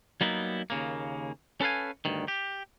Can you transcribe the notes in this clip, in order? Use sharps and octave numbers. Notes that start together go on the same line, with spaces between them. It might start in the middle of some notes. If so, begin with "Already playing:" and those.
F#3 G3 A#3 B3 D#4 E4
D#2 C#3 A#3
C#4 A4 B4 F5 G#5
D2 G2 D#3
G4